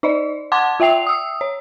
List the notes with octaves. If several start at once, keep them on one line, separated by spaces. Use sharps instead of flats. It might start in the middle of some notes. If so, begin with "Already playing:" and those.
D#4 D5 D#5
F#5 A5 C6 D6 G#6
F4 E5 G5 C7 F7
D#6 E6
C#5